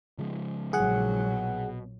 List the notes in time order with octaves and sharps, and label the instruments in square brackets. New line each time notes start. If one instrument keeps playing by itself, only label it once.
[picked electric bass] C#3 F3 G#3
[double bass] A#1 F#3 [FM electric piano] G#4 F#5
[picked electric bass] B2